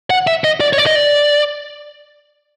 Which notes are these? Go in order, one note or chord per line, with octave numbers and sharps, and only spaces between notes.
F#5
E5
D#5
D5
C#5
D5
D#5
D5